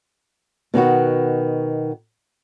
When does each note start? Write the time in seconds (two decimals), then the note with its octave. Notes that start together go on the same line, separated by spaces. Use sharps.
0.74 B2 D#3 B3 F#4